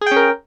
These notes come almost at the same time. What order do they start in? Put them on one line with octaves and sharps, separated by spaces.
G#4 G5 C#4 A#4